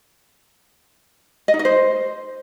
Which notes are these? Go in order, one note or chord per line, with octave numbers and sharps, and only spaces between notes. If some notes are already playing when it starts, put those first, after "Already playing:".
D#5
D#4
D#5
C5